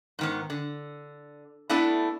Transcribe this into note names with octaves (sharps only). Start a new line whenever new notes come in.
G#2 D#3 B3
D3
A3 B3 D4 E4 A4